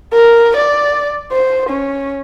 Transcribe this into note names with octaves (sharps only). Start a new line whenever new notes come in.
A#4
D5
C5
C#4